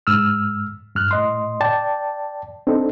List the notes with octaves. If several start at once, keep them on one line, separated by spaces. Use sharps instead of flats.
G#2 E6 F6
G2 F6 F#6
A2 D#5 C6
D5 G5 A5
C4 D4 D#4 A4